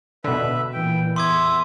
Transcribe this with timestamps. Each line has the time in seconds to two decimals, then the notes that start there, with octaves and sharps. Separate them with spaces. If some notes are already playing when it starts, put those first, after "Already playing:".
0.24 B2 D3 B4 E5
0.73 A#2 E3 G5
1.16 E2 E5 C6 D6 D#6 G#6